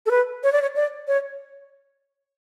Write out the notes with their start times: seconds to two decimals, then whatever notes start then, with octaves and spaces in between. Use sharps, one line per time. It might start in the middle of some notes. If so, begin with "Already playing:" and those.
0.06 A4
0.11 B4
0.44 C#5
0.52 D5
0.62 C#5
0.76 D5
1.08 C#5